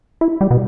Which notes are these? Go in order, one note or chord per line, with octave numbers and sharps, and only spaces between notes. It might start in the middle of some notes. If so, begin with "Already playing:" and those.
E4
G3
B2